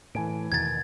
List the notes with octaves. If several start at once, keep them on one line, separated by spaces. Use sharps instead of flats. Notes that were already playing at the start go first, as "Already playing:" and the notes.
A2 E3 G#5 D7
E2 B2 D#3 G#6 A6